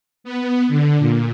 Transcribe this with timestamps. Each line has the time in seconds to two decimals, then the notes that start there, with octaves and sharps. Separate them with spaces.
0.24 B3
0.68 D3
0.98 A#2